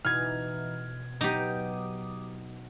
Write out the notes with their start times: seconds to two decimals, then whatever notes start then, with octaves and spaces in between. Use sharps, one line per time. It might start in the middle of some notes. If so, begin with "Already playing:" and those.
0.05 B2 E3 D#4 F6 G#6
1.21 F#3 B3 D#4 G4 D6 D#6